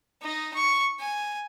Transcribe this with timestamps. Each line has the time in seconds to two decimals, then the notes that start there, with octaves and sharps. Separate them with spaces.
0.22 D#4 D#5
0.54 C#6
0.99 G#5